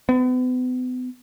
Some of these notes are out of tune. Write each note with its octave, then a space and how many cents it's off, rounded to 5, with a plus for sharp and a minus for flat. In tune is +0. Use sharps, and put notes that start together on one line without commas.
B3 +40